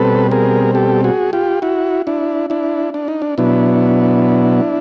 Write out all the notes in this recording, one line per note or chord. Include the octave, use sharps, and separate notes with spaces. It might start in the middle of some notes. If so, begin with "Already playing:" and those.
Already playing: B2 G3 C4 A4 B4
G#4 A#4
G4 A4
F#4 G#4
F4 G4
E4 F#4
D4 E4
D4 E4
D4
D#4
D4
B2 F#3 B3 D4 E4